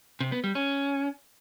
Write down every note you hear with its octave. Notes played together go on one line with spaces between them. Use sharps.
C3
B3
G3
C#4